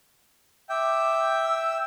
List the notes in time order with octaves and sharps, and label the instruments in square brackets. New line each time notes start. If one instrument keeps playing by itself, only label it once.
[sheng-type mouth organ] E5 G5 [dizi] D6
[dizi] E6